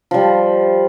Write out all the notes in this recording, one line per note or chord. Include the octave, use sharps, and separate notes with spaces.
F3 G3